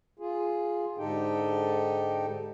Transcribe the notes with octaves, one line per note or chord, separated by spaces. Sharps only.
F4 G#4
G#2 D3 D#4 G4 A4 G5